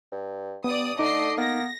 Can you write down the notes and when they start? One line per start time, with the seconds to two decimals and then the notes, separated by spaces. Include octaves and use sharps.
0.12 G2
0.64 G2 B3 D5 D#6
0.99 D3 A3 D#4 D#5 D6 C7
1.38 A#3 B3 A#6